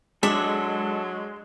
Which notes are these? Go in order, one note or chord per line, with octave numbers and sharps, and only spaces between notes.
F#3 G#3 D4 A4 E5